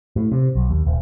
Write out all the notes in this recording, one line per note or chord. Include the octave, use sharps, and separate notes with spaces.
A2
C3
B1
D#2
D#1